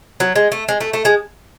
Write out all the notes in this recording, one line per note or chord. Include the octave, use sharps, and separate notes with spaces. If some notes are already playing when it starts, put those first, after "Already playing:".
F#3
G#3
A3
G#3
A3
A3
G#3